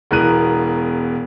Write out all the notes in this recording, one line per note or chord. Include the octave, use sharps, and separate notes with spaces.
E1 B2 E3 A#4 F#6 D#7